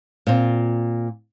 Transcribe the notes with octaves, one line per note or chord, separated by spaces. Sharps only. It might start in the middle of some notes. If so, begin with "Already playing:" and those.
A#2 C4 F4